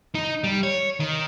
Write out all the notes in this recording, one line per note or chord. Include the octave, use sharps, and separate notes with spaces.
D#4
G3
C#5
D#3